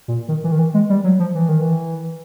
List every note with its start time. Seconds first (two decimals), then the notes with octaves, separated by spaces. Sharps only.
0.08 A#2
0.28 D#3
0.44 E3
0.52 D#3
0.59 E3
0.74 G#3
0.90 G3
1.04 F#3
1.20 F3
1.35 E3
1.49 D#3
1.61 E3